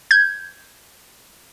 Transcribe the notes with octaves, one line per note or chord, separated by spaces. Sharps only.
G6 G#6